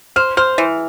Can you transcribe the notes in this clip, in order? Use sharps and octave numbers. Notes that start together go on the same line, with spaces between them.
C5 F6
C5 F6
E3